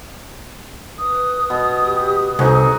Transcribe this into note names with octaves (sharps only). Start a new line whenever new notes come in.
B4 D#6
B2
G4
C2 D#4 F#4 G#4 A4